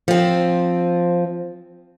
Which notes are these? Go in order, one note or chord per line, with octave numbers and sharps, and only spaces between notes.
F3 C4